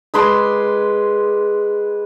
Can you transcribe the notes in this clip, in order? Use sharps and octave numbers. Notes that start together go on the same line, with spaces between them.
G#3 B4 C6 D6